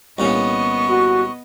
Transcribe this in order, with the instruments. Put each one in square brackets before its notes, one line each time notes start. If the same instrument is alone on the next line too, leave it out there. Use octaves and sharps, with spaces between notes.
[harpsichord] C2 A#2 C#4 [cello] B3 D#5 [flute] C#6
[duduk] F#4